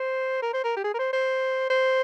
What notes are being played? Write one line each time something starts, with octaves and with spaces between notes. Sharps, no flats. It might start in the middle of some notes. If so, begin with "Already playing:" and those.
Already playing: C5
A#4
C5
A#4
G4
G#4
A#4
C5
C5
C5